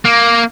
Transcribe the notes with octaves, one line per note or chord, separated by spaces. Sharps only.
A#3